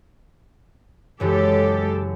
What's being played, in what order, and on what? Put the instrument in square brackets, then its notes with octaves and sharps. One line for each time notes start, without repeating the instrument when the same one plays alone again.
[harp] F#1 F#2 E3 [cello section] G#3 G4 A4